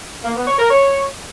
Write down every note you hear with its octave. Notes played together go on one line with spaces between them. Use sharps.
A#3
B3
C#5
A#4
C#5